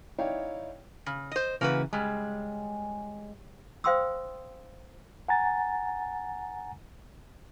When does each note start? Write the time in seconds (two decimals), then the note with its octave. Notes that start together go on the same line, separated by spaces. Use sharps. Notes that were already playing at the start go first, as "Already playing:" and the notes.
0.18 D#4 E4 C#5 D5 F5 G5
1.06 C#3
1.31 C5 D#5
1.61 C#3 E3 A#3 F#4 B4
1.93 C#3 G3 G#3
3.84 C5 F5 G5 C6 D#6 E6
5.28 F#5 G#5 A#5 A6